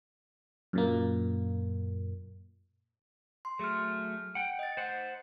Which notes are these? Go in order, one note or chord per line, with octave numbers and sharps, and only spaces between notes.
F#2 A#2 A#3
C6
F#3 A3 G#4 F6
F#5 G5
D#5 A6
C5 F#5